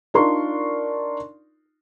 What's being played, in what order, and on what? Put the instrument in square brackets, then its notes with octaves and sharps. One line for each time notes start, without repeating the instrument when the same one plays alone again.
[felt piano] D4 D#4 F4 A#4 C6 C#6